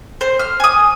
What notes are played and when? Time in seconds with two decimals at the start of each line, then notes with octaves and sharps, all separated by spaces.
0.21 C5
0.39 F6
0.60 G#5 D#6